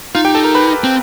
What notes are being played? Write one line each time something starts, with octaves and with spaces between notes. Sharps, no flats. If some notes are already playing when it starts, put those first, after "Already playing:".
D#4 F4 F5
G4 G5
A4 A5
A#4 A#5
B4 B5
C4